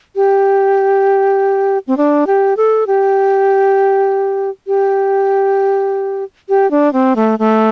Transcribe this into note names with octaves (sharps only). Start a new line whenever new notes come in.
G4
C4
D4
G4
A4
G4
G4
G4
D4
C4
A3
A3